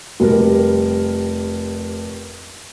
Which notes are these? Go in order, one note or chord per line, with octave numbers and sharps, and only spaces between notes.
F1 G3 A#4